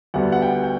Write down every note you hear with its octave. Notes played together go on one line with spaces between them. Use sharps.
D2 D3 G3 B3 F#5
F#5
G5
G5